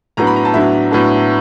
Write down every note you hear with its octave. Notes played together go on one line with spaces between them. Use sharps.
A2 F#3 B3 D4 A#5
B5
A#5
A5
A2 F#3 B3 D4 E5
A2 F#3 B3 D4